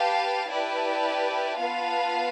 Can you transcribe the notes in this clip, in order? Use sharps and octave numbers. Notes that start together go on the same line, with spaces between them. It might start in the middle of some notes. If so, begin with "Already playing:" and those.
Already playing: G4 B4 F5 A5
E4 G4 B4 D5 A5
B3 F4 B4 F5 A5